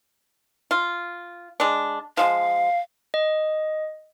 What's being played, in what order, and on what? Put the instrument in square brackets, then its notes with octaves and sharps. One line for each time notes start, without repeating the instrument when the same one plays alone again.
[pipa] F4
G#3 D4
[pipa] F3 G#3 [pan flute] F5
[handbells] D#5